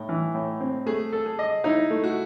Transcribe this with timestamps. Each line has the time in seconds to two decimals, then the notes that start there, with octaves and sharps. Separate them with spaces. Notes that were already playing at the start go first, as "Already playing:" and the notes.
Already playing: A2 D#4
0.09 E3
0.34 A2
0.60 C4
0.86 A3 G#4
1.13 A4
1.26 G#4
1.39 D#5
1.64 D#4 E4
1.91 A3
2.04 F#4